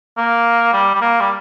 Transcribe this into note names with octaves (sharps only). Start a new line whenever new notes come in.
A#3
G3
G3
A#3
G3